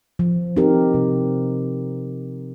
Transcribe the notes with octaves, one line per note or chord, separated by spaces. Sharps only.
F3
C4 D#4 G4 A#4
C3